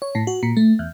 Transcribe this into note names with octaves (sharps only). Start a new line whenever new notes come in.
C#5
A2
F#4
A#2
A3
E2